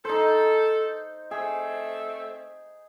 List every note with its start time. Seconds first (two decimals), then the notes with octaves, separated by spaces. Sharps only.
0.05 D#4 A4 C5
1.31 A3 C4 G#4 E5